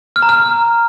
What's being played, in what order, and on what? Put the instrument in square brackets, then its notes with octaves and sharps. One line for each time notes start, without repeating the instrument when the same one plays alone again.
[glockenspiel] F6
A#5
F6